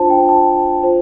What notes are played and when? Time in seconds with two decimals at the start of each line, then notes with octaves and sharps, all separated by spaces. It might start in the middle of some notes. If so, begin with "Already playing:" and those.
Already playing: D4 F4 C5 A5
0.10 G5
0.29 A5
0.83 F4 C5